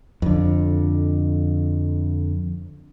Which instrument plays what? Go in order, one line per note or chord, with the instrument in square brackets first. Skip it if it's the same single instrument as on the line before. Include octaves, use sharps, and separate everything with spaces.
[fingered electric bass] F2 D3